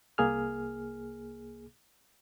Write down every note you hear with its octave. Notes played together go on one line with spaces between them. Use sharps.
C2 A#3 G#4 F6